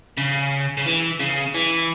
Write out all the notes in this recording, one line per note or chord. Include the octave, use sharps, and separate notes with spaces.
C#3
C#3
E3
C#3
E3